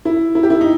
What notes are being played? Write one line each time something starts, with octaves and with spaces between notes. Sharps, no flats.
E4
E4
G4
E4
D#4